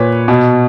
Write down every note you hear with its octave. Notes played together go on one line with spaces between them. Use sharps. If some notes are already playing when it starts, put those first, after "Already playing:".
Already playing: A#2 B4 C#5
B2